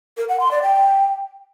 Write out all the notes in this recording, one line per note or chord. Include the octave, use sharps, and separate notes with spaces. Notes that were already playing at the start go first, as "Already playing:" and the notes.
A#4
F#5
C6
D5
G5